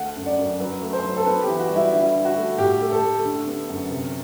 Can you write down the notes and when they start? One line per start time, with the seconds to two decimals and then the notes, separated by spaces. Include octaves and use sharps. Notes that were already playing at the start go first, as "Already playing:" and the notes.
Already playing: D2 A3 F#5
0.16 F#2
0.26 D5
0.38 F#2
0.60 F#3 B4
0.82 A3
0.93 C5
1.05 F#3
1.16 A4
1.26 B3 B4
1.43 E3 G4
1.59 F#4
1.71 G3 E4
1.92 D3 E4
2.15 D3
2.25 F#4
2.36 A3
2.58 A2 G4
2.81 A3
2.92 A4
3.03 A3
3.24 D3
3.47 B3
3.69 F#2
3.91 C3